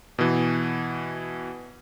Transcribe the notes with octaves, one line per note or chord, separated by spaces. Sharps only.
B2 E3